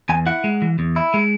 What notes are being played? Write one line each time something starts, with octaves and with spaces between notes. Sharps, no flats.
E2 G#5
E4 F#5
G#3
E3
E2
E4
G#3